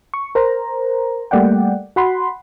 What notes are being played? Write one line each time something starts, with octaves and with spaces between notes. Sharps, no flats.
C#6
A#4 C5 A#5
G3 A3 A#3 D5 F#5 G5
F#4 F#5 B5 C6